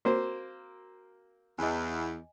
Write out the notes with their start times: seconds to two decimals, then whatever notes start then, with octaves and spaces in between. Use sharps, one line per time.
0.05 A#3 C4 F#4 C5
1.59 E2 D#5 G#5